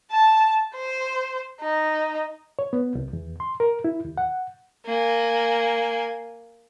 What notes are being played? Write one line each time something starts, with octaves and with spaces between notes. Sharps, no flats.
A5
C5
D#4
C#5
B3
C2
E2
C6
A#4
E4
D#2
F#5
A#3 G#5